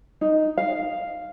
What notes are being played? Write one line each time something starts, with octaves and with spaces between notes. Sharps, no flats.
D#4
F5